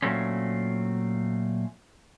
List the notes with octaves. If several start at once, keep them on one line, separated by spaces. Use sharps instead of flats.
A#2 F#3 A3 C4 C#4